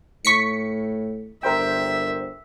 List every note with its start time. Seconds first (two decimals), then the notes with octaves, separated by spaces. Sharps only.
0.25 A2 C#6 B6 C#7
1.43 G1 A#4 C5 E5 G5